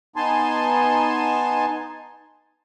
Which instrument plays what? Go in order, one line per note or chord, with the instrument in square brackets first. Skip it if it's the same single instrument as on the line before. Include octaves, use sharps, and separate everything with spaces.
[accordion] B3 D#4 G#5 A5 C6